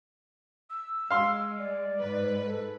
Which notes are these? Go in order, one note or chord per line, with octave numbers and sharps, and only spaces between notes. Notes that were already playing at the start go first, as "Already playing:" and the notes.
E6
G#3 F5 C6
D5
G#2 B4
A4